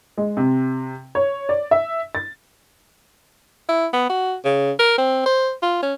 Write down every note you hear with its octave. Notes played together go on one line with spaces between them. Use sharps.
G#3
C3
C#5
D5
E5
A6
E4
B3
F#4
C#3
A#4
C4
C5
F4
C#4